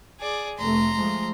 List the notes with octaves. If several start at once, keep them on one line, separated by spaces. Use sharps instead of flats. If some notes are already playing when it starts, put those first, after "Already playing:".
G#4 D5
F1 A3 A#5 C6
F3 G#3 A3